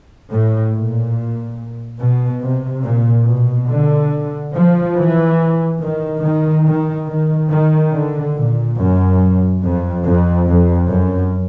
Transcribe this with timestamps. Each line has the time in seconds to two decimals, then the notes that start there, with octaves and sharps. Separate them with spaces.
0.30 A2
0.73 A#2
2.00 B2
2.42 C3
2.84 A#2
3.27 B2
3.69 D3
4.55 F3
4.97 E3
5.81 D#3
6.23 D#3
6.65 D#3
7.08 D#3
7.51 D#3
7.93 D3
8.35 A#2
8.77 F#2
9.63 F2
10.05 F2
10.47 F2
10.90 F#2